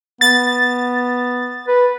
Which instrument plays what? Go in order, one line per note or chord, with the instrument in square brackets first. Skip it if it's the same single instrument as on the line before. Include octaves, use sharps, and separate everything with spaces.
[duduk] B3 [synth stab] A6
[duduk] B4